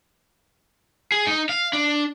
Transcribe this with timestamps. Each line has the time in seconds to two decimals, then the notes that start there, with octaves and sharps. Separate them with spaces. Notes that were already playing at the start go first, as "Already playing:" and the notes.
1.12 G#4
1.27 D#4
1.49 F5
1.73 D4